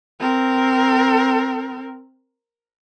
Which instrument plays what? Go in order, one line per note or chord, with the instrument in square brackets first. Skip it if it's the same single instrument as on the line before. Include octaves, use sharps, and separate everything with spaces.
[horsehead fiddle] C4 A#4